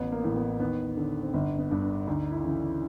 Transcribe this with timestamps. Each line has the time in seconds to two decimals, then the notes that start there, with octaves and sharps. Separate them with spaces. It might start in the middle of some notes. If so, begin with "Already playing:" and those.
Already playing: A1 B3
0.12 A#3
0.24 A2 E3
0.36 B3
0.60 D#2 B3
0.97 D3
1.23 C4
1.33 G1 B3
1.58 B3
1.71 G2 D3
1.83 D4
2.07 D2 D#4
2.32 E4
2.43 C#3 E3
2.55 E4